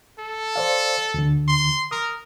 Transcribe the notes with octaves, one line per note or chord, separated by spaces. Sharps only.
A4
C5 D5 F5
D2 D3
C6
A#4 D#6